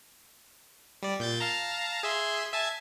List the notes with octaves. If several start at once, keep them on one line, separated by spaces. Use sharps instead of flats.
G3 D5
A#2 G6 A6
F5 A5 A#5
G#4 E5 C6
E5 G#5 A5